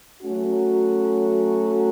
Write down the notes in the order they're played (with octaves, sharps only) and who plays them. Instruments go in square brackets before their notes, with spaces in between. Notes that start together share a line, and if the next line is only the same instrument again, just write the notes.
[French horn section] F#3 A3 C#4 F#4